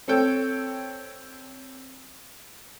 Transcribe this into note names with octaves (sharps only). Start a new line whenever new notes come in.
C4 A4 C#5 G5